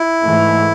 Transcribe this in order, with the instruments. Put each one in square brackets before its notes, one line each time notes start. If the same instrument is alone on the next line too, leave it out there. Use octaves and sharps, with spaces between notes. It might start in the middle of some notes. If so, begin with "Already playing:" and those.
Already playing: [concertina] E4
[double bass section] G#2 E3 A3